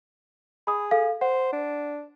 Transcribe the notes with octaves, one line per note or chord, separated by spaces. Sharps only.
G#4 B5 D#6
A4 F5
C5 F#5
D4